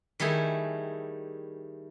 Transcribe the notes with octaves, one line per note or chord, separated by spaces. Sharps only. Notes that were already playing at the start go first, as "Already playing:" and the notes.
D#3 G3 A3 E4 G#4